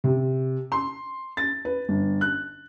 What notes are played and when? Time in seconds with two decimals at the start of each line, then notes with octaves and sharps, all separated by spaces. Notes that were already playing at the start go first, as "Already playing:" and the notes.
0.04 C3
0.72 C6
1.37 A6
1.65 B4
1.89 G1
2.21 F#6